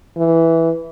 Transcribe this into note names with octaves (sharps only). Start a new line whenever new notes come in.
E3